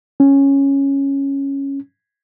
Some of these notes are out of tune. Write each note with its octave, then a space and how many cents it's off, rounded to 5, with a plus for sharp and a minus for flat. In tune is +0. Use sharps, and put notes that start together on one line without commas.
C#4 -5